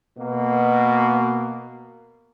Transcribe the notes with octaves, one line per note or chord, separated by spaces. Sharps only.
B2 A#3